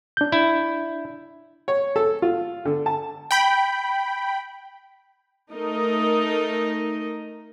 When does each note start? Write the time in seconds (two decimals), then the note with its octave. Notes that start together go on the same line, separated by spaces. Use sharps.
0.17 D4 G6
0.32 E4
1.68 C#5
1.96 A4
2.22 F4
2.65 D3
2.86 A5
3.31 G5 B5
5.52 A3 D#4 A#4 D#5